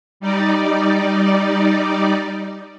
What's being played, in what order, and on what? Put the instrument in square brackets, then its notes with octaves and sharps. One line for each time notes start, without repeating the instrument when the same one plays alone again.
[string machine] G3 D#4 D5